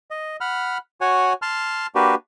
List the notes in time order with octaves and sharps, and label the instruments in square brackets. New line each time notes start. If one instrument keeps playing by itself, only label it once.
[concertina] D#5
F#5 B5 F6
F#4 C#5 F#5 G#5
A5 C6 F6
A#3 D4 F#4 G4 B4